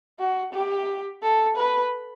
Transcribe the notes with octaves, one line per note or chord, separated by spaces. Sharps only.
F#4
G4
A4
B4